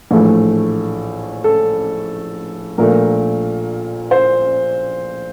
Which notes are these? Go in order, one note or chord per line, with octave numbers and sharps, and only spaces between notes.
A#1 A2 E3 A3
A4
A#1 A#2 A3 A#4
C5